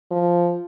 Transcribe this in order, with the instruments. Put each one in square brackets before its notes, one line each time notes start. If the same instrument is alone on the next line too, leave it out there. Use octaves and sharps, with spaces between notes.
[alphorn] F3